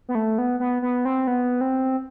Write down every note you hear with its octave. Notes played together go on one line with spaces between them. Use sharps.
B3
A3
B3
B3
B3
C4
B3
C4